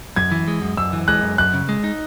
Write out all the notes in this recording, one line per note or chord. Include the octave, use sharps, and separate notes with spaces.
F#2 G#6
E3
G#3
F#2
F#2 E6
E3
G#3 F#6
F#2
F#2 F#6
C#3
G#3
D#4